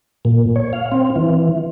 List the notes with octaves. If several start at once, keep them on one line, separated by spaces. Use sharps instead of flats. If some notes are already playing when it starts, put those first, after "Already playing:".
A#2
C#5
F5
C4
E3